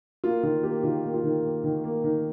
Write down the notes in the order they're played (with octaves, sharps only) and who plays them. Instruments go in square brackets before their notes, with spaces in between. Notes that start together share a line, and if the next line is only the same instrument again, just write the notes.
[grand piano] A#3 F4
D#3 F4
A#3 G4
D#3 F4
A#3
F4
D#3
A#3
D#3
A#3
D#3